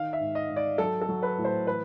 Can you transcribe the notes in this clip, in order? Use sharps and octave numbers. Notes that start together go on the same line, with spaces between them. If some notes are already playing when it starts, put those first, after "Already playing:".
Already playing: D#3 F5
E5
G#2
D#5
G#2
D5
F#3 A4
A4
F#3
B4
A2
C5
E3 B4